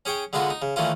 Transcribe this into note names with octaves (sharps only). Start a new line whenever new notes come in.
C#4 G#4 C#5 G5
D3 G#3 B3 F4 F#4
D#4
C#3
D#3 E3 A3 A#3 C#4 F4